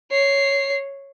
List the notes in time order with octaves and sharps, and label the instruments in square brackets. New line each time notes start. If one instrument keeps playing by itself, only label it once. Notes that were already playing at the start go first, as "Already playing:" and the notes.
[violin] C#5 C7